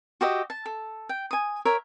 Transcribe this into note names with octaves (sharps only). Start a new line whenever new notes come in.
F#4 G4 D#5 E5
A5
A4
G5
G#5 D#6
A#4 C#5 E5